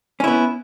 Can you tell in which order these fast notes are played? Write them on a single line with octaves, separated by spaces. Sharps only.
C#4 E4 B3